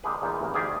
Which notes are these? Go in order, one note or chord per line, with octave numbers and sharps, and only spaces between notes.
D3 G#3 A#3 G4 G#4 B4
E2 A#2 A#3 B3 D#4
A1 A#3
D2 D#3 G4 G#4 D5 F5